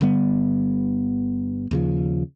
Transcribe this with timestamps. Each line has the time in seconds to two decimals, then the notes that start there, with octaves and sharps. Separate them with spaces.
0.01 G1 D3 G3 B3
1.71 D#2 C#3 F3